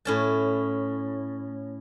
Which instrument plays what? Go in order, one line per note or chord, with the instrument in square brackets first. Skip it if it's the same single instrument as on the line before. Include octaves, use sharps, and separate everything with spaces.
[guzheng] A2 C#4 A5